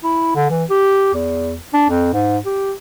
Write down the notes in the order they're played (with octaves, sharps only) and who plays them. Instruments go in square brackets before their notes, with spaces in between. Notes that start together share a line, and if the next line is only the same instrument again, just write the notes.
[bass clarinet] E4
D3
E3
G4
E2
D4
F2
G#2
G4